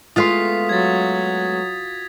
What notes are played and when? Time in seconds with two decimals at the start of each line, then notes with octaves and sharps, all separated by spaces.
0.16 G#3 A3 B3 F4 F5 C6 D#6 B6
0.69 F#3 G#6 A6